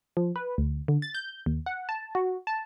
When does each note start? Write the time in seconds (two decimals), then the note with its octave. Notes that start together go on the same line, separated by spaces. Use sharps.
0.17 F3
0.36 B4
0.58 D2
0.88 D3
1.02 A6
1.15 G6
1.46 D#2
1.66 F#5
1.89 A5
2.15 F#4
2.47 A5